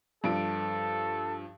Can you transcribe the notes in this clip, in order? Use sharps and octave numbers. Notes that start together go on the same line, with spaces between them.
G2 F3 A4 D7